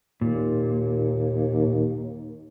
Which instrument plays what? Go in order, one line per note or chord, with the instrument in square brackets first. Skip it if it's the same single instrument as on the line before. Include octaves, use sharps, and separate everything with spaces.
[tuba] D#2 [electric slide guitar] A#2